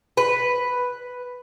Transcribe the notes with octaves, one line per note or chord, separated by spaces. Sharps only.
B4